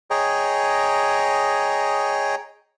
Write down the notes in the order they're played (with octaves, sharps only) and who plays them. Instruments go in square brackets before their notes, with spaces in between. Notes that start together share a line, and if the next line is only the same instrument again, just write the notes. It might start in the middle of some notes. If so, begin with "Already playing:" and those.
[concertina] G#4 C#5 D#5 G5 A#5